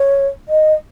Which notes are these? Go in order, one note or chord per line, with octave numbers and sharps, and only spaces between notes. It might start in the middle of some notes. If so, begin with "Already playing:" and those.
Already playing: C#5
D#5